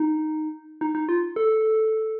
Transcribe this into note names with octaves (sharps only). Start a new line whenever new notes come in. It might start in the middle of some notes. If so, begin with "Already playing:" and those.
Already playing: D#4
D#4
D#4
F4
A4